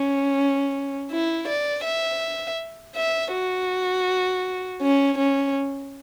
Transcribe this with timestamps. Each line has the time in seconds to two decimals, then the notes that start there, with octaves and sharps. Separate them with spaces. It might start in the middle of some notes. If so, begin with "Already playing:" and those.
Already playing: C#4
1.11 E4
1.48 D5
1.84 E5
2.96 E5
3.33 F#4
4.82 C#4
5.18 C#4